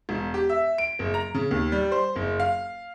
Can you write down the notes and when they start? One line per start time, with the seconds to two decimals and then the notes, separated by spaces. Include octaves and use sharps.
0.09 E1
0.34 G4
0.49 E5
0.78 D7
0.99 F#1
1.14 A#5
1.35 C#3
1.51 D#2
1.72 G3
1.92 C5
2.16 F#1
2.40 F5